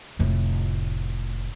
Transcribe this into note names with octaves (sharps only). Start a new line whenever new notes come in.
F1 A2